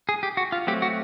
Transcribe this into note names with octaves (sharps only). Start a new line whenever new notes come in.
G#4
G4
F#4
F4
F#3 A3 C4 G4
F#4